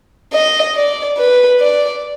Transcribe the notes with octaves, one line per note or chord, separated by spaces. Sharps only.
D#5
D5
B4
D5